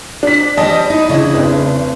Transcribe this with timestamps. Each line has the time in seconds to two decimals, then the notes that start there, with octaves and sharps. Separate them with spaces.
0.23 D4 B6
0.57 G3 C5 D5 D#5 A5
0.90 D#4 E4
1.09 C#3 D4 E4
1.34 F1